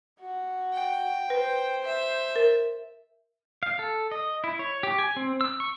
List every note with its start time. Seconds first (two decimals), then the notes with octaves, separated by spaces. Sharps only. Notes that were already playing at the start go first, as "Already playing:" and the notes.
0.20 F#4
0.73 G5
1.30 B4 C5
1.84 E5
2.36 A#4
3.63 F5
3.79 A4
4.11 D#5
4.44 E4
4.59 C#5
4.83 G4
4.98 G#5
5.16 C4
5.41 E6
5.60 C#6